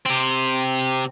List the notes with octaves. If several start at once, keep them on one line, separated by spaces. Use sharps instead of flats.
C3 C4